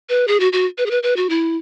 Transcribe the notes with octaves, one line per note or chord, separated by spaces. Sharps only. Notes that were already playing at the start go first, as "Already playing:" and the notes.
B4
G#4
F#4
F#4
B4
G#4
B4
B4
F#4
E4